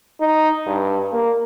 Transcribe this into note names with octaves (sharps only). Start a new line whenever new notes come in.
D#4
G2
A#3